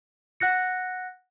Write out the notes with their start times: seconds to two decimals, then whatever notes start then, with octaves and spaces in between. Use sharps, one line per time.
0.40 F#5 F#6 A#6 C#7